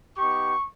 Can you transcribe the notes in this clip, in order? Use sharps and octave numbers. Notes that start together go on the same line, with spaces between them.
B3 D#4 G4 C#6